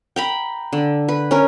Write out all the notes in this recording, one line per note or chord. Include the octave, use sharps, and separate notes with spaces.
G5 A#5 B5
D3
B4
C#4 A#4